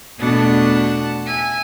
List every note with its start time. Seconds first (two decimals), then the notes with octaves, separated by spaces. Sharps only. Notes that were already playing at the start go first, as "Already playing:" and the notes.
0.19 E2 B2 A3 D4 F#5 A5
1.27 E5 G#5